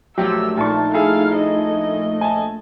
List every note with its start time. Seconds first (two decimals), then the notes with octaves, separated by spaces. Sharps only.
0.17 A#1 F3 F#3 A3 G4 E6
0.57 A#2 D#4 A5 C#6
0.94 E4 G#4 A4 F5
1.36 D#5
2.21 G#5 A5